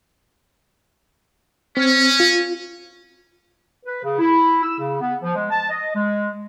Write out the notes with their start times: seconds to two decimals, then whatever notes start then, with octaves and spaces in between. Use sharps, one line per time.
1.77 C4 C#4
2.20 F4
3.85 B4
4.03 C#3
4.19 E4
4.63 E6
4.79 C#3
5.01 B3
5.22 F3
5.35 G#3
5.50 A5
5.70 D#5
5.94 G#3